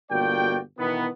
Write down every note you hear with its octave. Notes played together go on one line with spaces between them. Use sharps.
G1 B2 A#3 F#4 D5 G5
B2 D#3 E3 B3